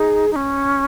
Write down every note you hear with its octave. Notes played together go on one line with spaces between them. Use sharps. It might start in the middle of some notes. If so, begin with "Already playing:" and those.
Already playing: D#4 G#4
D#4
C#4